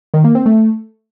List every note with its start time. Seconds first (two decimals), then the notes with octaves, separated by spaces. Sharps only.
0.14 D#3
0.24 A#3
0.35 C4
0.46 A3